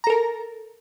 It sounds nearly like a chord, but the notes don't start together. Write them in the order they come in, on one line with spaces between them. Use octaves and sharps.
A#5 A4 A#4